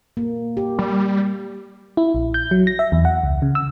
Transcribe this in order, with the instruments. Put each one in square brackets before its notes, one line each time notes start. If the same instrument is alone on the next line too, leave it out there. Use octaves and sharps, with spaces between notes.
[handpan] A#3
G4
[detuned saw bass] G3
[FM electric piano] E4
A#1
G6
F#3
A#6
E5
E2
F#5
C#2
C#3
E6